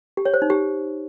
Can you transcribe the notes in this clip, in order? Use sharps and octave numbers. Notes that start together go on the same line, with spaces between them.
G4
C#5
C5
D#4
G4